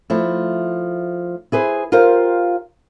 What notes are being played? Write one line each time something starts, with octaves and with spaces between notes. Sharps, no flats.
F3 A3 E4
E4 G#4 B4 C5
F4 G4 A#4 C5 F5